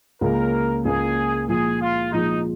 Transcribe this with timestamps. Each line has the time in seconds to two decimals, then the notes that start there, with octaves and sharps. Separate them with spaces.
0.21 C#2 C#3 A#3 A#4
0.85 C#2 C#3 A#3 G#4
1.48 A#2 F3 G#3 F4 G#4
1.80 F4
2.12 A#2 F3 G#3 D#4 F4